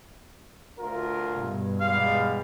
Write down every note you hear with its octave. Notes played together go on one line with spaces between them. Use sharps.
D2 F4 A#4
G2 B2
E2 G3 G#3 F5